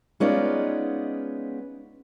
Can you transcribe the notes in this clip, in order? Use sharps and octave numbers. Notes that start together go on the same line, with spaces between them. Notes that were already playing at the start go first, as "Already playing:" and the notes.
G#3 B3 C#4 D#4 F4 D5